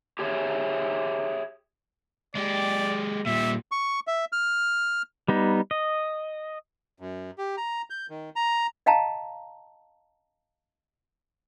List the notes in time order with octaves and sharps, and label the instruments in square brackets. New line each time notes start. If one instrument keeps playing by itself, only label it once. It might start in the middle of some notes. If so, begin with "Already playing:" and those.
[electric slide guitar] G4 G#4 C#5 E5
[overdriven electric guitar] G#3 G4 [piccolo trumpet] D5
[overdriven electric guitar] A#2 G3 [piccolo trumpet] E5
[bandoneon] C#6
E5
F6
[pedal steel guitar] G3 B3 D#4
D#5
[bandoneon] F#2
G4
A#5
G6
D#3
A#5
[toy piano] D#5 F5 G5 A5 A#5